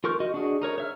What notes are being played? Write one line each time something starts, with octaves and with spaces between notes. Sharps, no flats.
F4 A#4 C#6 F6 G6
F#4 D#5
D4 F#4 G#4
D#4 A#4 C#5
C#5 E5 F6